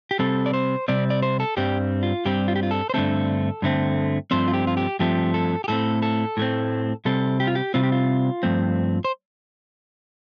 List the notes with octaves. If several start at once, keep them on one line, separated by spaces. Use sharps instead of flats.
G4
C3 G3 C4 A4
D5
C5
C3 G3 C4 D5
D5
C5
A4
G2 G3 C4 G4
F4
G2 G3 C4 G4
F4
G4
F4
A4
C5
G2 D3 A3 C4 A4
G2 D3 A3 C4
G2 F3 A3 C4 C5
F4
G4
F4
G4
G2 F3 A3 C4 G4
A4
G4
A2 A3 C4 A4
A4
A2 A3 C4
C3 G3 C4 A4
G4
F4
G4
C3 G3 C4 F4
G4
F4
G2 F3 A3 C4
C5